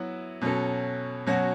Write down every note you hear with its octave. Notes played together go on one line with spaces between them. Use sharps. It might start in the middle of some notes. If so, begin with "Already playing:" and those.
Already playing: F#3 B3 E4
B2 F#3 C#4 A4
B2 F#3 C#4 F#4